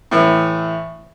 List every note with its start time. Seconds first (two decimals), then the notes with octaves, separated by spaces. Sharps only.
0.11 A2 E3